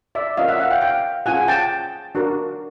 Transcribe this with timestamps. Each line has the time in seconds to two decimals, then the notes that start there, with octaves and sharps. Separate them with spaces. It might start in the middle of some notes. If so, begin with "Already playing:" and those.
0.15 D5 E5
0.37 C#4 F4 A#4 C#5 D#5 F5
0.48 E5 F#5
0.60 E5 F#5
0.71 F5 G5
0.81 F5 G5
1.26 C#4 F4 G#4 F#5 G#5
1.48 G5 A5
2.15 D4 F#4 A#4